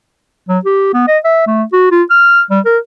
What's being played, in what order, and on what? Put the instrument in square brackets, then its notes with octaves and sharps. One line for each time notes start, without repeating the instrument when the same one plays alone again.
[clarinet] F#3
G4
B3
D#5
E5
A3
F#4
F4
F6
G3
A#4